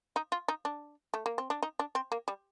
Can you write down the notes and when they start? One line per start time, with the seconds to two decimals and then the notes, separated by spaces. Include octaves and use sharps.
0.16 D#4
0.32 F4
0.48 D#4
0.65 D4
1.14 A3
1.26 A#3
1.38 C4
1.50 D4
1.63 D#4
1.79 D4
1.95 C4
2.12 A#3
2.28 G3